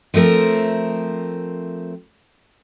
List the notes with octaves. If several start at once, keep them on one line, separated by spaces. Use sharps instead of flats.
F3 A3 C4 A#4